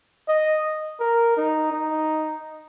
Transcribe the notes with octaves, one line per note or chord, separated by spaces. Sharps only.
D#5
A#4
D#4
D#4